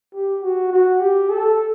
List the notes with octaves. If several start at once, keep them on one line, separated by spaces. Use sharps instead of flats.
G4
F#4
F#4
G4
A4